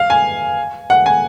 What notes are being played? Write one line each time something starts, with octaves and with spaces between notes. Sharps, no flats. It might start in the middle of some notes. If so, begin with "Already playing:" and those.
Already playing: F5
G#5
F#5
G#5